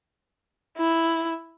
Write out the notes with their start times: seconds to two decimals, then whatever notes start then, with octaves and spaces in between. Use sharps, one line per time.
0.77 E4